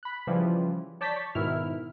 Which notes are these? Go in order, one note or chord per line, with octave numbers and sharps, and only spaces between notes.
B5 F#6
C#3 E3 F3 G3
C#5 D5 A5 G6 A6 B6
C#6
G#2 B2 D#3 E4 E5 F6